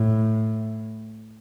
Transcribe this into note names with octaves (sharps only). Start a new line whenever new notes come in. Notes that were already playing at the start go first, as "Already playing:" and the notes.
Already playing: A2